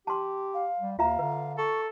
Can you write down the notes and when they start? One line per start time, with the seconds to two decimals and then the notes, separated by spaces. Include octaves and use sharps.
0.07 G4 A5 C6
0.54 F5
0.80 G3
0.99 D#2 F4 E5 F5 A#5
1.19 D3 B4
1.58 A4 C#6